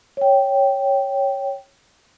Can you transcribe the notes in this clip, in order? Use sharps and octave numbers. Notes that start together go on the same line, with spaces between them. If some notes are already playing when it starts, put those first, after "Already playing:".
C#5 G5